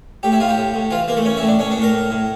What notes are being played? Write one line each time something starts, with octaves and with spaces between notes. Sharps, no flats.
A2 G4
E4
A2 F4
G4
A2
A2
E3 F4
E3 A#3
A3
E3 C#4
A2 E4
D4
A2 C#4
D4
A2
A#4
A2
A2